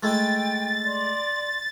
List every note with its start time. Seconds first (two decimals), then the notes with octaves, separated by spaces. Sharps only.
0.03 G#3 A3 E4 G5 A6
0.85 D5 C6